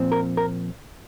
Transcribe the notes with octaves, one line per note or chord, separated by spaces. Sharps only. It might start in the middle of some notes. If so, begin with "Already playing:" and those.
Already playing: A#2 F3 C4
A#4
A#4